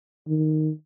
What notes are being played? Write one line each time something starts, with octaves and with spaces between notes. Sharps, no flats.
D#3